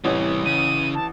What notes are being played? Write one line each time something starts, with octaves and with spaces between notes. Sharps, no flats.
A1 C3 E3 G3 C#5
C#3 D#7
A5